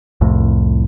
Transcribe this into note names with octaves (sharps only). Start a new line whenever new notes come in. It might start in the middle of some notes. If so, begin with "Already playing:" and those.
C2 F2 A2